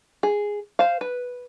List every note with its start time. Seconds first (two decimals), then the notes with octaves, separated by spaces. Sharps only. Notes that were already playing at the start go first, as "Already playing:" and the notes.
0.23 G#4
0.79 C5 F5
1.01 B4